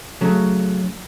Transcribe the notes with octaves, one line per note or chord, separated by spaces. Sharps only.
C#3 F#3 A3